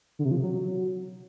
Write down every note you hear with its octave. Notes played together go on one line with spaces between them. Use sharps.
D3
C3
F3
C3
F#3